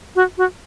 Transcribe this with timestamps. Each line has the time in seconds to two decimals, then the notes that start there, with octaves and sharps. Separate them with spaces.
0.15 F#4
0.37 F#4